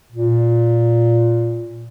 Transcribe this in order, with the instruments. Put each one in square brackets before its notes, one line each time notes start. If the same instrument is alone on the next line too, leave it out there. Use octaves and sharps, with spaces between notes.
[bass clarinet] A#2